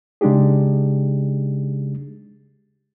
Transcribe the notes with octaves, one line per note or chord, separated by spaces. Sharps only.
C#3 G#3 D4 D#4 G4 G#4